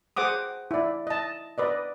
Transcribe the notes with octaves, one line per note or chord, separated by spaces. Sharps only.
G#4 C5 F#5 D6 D#6
E4 D5
D#5 A5
B4 D5 D#5